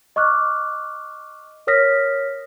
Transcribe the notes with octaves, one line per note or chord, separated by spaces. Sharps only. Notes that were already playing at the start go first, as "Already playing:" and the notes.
D#5 C#6 D6 F6 F#6
A#4 C#5 D#6 F6 A#6 B6